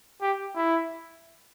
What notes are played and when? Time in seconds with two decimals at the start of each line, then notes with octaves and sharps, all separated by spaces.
0.21 G4
0.56 E4